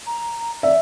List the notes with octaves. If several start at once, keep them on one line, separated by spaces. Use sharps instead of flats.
A#5
D5 E5